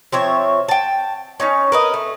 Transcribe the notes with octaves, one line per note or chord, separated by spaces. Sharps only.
F3 C4 C#5 E5
G5 A5
C#4 D#4 C#5
A#4 B4 D#5
A3